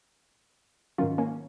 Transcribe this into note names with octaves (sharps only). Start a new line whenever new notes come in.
G#2 D#3 F#3 C#4 F4
A#3 C#4